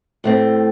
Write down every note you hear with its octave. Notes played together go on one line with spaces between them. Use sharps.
A2 A3 C4